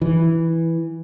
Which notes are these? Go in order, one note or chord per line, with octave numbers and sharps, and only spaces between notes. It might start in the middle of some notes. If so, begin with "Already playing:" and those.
E3